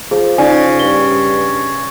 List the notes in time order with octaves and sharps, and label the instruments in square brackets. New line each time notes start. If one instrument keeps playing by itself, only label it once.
[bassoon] F3 [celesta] G#4
[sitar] C#3 [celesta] D#4 D5 G#5
[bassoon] G2 [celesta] G7